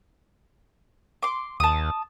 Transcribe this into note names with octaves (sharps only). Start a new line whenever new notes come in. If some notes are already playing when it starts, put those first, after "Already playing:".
C6 D6
D#2 A5 D#6